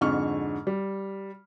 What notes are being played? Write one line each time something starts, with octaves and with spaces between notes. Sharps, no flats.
F2 G#2 D3 C#6 F6
G3